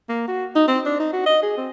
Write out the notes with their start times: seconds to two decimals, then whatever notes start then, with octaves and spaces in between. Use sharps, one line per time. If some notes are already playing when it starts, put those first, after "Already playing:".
0.09 A#3
0.28 F#4
0.56 D#4
0.68 C4
0.86 D4
1.00 D#4
1.13 F#4
1.26 D#5
1.43 G#4
1.57 C4